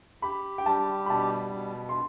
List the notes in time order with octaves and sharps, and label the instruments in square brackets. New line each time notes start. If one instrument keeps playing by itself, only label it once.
[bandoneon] G4 [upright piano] B5
[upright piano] G5
[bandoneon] G3 [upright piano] A5
[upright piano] B5
[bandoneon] B2 [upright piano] A5
[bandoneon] B2
[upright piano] C6